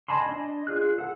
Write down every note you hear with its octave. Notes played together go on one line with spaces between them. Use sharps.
D#5 G#5 A5 B5 C6
D4 D#5
F4 G#4 F#6
A4 F#5